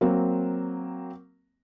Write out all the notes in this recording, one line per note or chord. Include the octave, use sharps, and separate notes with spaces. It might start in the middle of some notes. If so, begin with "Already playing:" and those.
F#3 A#3 C4